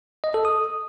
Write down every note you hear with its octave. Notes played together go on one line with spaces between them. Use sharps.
D#5
A4
D#6